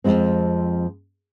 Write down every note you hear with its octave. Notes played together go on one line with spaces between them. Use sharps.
F2 G#2 F3 G#3 C4